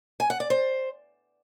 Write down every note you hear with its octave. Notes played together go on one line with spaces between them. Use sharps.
G#5
F#5
D5
C5